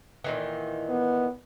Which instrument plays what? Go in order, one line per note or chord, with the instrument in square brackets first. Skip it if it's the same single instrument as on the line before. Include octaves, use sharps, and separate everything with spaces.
[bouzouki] A#2 D#3 E3
[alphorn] B3